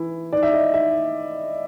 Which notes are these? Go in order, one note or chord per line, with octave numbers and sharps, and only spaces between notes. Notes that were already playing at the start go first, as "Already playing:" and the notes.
Already playing: E3 E4
D#3 D5
E5
D#5
D#3 E5